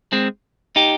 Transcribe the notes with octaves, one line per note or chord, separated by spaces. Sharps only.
G#3 C4
D#4 G4